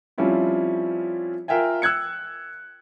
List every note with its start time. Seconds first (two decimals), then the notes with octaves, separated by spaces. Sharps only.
0.18 F3 G3 C4 C#4 E4 F4
1.48 F4 A#4 E5 F5 G5 G#5
1.82 E6 F#6 G#6 C#7